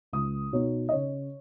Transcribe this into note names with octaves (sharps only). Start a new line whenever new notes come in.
C#2 D#6
B2 B3 D#4 C#5
D#5
C#3 C#5